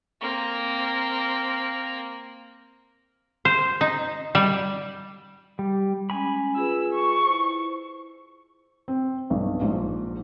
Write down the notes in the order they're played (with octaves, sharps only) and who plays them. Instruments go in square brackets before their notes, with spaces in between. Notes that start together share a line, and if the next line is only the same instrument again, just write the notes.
[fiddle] A#3 C4
[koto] C5
D#4
G3
[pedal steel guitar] G3
[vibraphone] G#3 C#4 [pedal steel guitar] G#5 B5
[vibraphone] F4 G#4 B4 [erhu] E6
[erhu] C#6
[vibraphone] E4 C5
[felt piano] C4
B1 G2
A#1 G#2